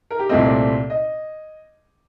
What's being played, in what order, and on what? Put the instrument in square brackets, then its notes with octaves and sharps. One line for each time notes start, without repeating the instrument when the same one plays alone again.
[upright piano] A#4
G4
C2 A#2 A3 C4 D#5
D5
D#5